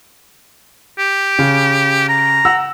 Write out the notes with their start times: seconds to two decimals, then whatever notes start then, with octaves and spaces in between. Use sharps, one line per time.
0.99 G4
1.39 C#3
2.09 A#5
2.45 F#5 E6